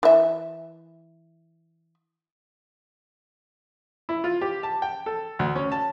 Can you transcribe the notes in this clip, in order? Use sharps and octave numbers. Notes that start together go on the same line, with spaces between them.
E3 E5
E4
F4
G4
A5
G5
A4
D2
C#4
A5